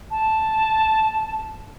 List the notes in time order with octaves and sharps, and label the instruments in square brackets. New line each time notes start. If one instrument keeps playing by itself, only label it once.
[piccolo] A5